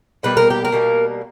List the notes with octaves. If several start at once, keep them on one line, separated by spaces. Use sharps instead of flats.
B2 G3 A#3 B4
A#4
G4
A#4
B2 G3 A#3